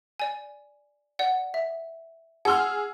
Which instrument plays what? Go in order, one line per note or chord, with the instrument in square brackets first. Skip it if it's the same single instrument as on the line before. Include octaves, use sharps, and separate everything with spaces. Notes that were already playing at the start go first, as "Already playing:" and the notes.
[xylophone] D5 G#5
D5 F#5
E5
[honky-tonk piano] G#4 E6 F6 [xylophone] F#5 C6